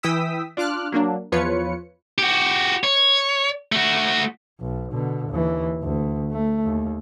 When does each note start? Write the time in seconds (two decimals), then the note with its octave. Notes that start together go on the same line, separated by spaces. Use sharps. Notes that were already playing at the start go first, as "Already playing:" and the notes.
0.03 E3 E4 G5 D#6 E6 B6
0.57 D4 F4 D6 F6 F#6
0.92 F#3 A#3 D4
1.32 E2 F3 F4 B4 C#5 C#7
2.18 F#4 G4
2.84 C#5
3.72 A3 F#4
4.60 B1
4.92 B2 D3
5.30 D#2 E3
5.82 D2
6.31 A3
6.65 D#2